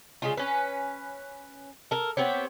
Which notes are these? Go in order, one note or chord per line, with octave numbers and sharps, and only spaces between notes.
C#3 G#3 F4
C#4 B4
A4 A#4
B3 C4 G4 C#5